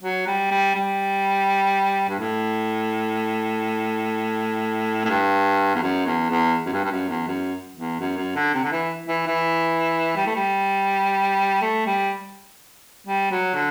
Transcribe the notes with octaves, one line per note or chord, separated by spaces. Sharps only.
F#3
G3
G3
G3
G2
A2
A2
G2
E2
F#2
E2
E2
F#2
G2
G2
F#2
E2
F#2
E2
F#2
F#2
D3
C3
D3
E3
E3
E3
G3
A3
G3
A3
G3
G3
F#3
D3